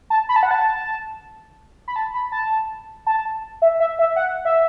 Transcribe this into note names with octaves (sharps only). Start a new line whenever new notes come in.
A5
B5
A5
F#5
A5
B5
A5
B5
A5
A5
E5
E5
E5
F#5
E5